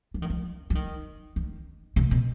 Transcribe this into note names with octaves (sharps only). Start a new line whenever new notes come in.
F3
D#3
F3
F3
D#3
D#3
C3
B2